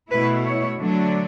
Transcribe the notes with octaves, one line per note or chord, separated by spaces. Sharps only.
B2 A3 E4 B4
C#5
D3 F#3 A3 D4